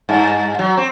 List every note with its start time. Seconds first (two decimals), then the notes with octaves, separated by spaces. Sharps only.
0.09 G2
0.59 F#3
0.77 C4